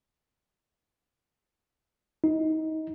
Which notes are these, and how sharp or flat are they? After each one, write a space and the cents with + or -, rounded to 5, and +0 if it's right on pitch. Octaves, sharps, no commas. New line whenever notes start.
D#4 +25